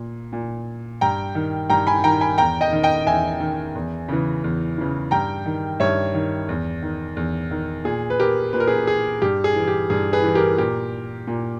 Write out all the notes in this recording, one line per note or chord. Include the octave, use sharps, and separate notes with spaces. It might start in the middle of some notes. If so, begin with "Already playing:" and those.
Already playing: A#2
A#2
G2 G5 A#5
D#3
G2 G5 A#5
G#5 B5
D#3 G5 A#5
G#5 B5
E2 G5 A#5
D#5 G5
D#3
D#5 G5
E2 E5 G#5
D#3
E2
C#3 E3
E2
C#3 E3
G2 G5 A#5
D#3
G2 C#5 E5
D#3
E2
D#3
E2
D#3
A#2 G#4
B4
G4 A#4
A#2 B4
A#4
G#4 B4
G#4
G2 G4
G#4
E3
G4
G2 G#4
G#4 B4
E3
G4 A#4
A#2 G4 A#4
A#2